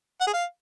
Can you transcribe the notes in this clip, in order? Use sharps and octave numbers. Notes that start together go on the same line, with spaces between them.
F#5
G#4
F5